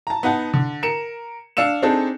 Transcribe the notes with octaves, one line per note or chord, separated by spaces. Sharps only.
A5 A#5
B3 D#4 F#5 A5
D3
A#4 C#7 E7
D4 F5 E6 C#7 E7
C4 D4 D#4 G#4 A4